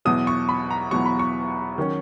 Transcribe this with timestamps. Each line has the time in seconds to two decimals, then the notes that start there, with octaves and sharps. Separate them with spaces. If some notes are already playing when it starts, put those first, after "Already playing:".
0.05 E2 B2 F#3 D#6
0.27 C#6
0.49 B5
0.70 A#5
0.91 E2 B2 F#3 C#6
1.06 B5
1.19 C#6
1.78 D#3 F#3 C#4